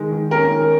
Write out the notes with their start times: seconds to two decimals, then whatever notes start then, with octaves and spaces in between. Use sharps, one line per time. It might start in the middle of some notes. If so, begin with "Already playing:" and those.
Already playing: D#3 G#3
0.12 D#3
0.31 C#4 A#4
0.51 D#3